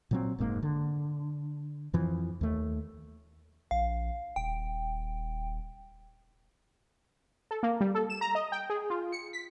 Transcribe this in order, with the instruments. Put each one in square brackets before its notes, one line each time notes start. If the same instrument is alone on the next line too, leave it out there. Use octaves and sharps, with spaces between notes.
[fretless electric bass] A#2 F#3 C4
F1 G#2 B2 A#3
D3
F2 E3 F3
D#2 A3
[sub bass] A#1 [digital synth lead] F5
[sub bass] D#1 [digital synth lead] G5
[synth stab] A4
A#3
G3
A4
E7
A#5
D#5
G5
G#4
F4
C#7
B6